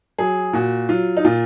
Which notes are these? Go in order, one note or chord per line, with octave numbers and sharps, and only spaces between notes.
F#3 G#4
A#2 F#4
F#3 F4
D#4
A#2 F4